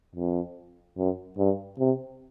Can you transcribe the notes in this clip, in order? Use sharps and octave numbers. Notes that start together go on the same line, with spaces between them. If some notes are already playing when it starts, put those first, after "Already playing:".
F2
F#2
G2
C3